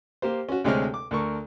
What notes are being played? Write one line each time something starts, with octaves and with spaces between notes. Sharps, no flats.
A#3 G4 C5
C#4 F#4
D2 C3 G#3 C4 C#5 F6
D6
D2 A4 A#4 C#6